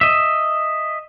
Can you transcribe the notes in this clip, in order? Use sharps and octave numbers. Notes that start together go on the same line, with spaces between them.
D#5 E5